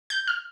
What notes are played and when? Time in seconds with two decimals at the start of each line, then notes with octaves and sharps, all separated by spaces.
0.10 G6
0.27 F6